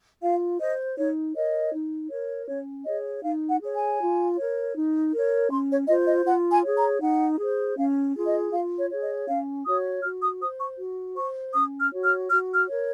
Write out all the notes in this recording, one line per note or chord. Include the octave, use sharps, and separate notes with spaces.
F4 F5
C5 D#5
D#4 C#5
A#4 C#5 D#5
D#4
A#4 C#5
C#4 C#5
G#4 C#5 D#5
D#4 F5
F#5
G#4 C#5
G#5
F4
A#4 C#5
D#4
A#4 C#5
C#4 C6
C#5
F4 C5 D#5
D#5
F4 F#5
G#5
G#4 C#5
A#5
D#4 F#5
G#4 C5
C#4 F5
F4 G#4
D#5
F4 F5
C#5
G#4 C#5
D#5
C#4 F5
F#4 C#5 D#6
F#4 F6
D#6
C5 D#6
C#6
F#4
C5 C#6
C#4 D#6
F6
F#4 C#5
F6
F#4 F6
F6
A#4 C#5